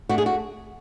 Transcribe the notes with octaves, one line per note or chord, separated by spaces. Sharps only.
A3 D4 F#4
G#4
F#4